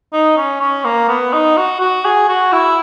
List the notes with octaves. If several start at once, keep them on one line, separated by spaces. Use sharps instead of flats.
D#4
C#4
C#4
A#3
B3
D#4
F#4
F#4
G#4
F#4
E4